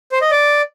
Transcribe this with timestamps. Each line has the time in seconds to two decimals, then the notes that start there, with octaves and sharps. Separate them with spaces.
0.12 C5
0.22 D#5
0.31 D5